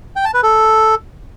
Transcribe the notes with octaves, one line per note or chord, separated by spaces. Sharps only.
G5
A5
B4
A4